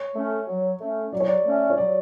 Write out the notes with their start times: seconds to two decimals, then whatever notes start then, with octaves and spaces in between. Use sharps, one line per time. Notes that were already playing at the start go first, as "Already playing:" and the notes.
Already playing: C#5
0.15 A3 C#4
0.47 F#3
0.80 A3 C#4
1.12 F#3 D5
1.20 C#5
1.28 D5
1.45 A3 C#4
1.70 C#5
1.78 F#3 D5